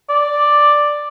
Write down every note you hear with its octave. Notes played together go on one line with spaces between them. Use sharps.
D5